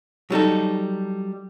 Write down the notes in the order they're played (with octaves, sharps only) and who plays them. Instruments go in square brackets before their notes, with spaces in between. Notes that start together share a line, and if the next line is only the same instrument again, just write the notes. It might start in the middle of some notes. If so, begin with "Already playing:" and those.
[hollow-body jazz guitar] F#3 G3 D#4 A4